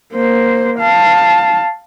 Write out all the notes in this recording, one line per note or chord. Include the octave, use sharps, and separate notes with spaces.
A#3 C5
F5 A5